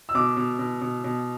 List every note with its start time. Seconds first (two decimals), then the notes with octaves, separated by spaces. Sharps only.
0.09 E6
0.14 B2 D6
0.37 B2
0.59 B2
0.81 B2
1.04 B2